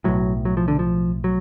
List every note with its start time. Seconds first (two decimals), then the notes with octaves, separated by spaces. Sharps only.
0.04 B1 A2 F#3
0.45 F#3
0.57 F3
0.68 D3
0.79 F3
1.24 F#3